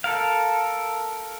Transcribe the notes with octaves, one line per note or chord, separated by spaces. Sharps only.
A4 A#4 F5